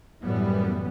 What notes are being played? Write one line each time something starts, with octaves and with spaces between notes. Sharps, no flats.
F#2 A2 E3 G3 B3